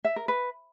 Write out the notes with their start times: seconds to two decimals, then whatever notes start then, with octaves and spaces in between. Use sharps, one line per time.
0.04 E5
0.16 A#4
0.28 B4